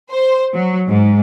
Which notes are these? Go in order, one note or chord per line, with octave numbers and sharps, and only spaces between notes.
C5
F#3
G#2